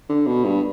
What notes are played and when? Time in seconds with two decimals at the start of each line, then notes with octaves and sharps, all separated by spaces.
0.09 D3
0.27 B2
0.45 G2